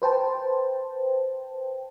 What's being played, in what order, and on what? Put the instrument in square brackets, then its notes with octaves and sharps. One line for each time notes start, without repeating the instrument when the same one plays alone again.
[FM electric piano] B4 C5 G5 A5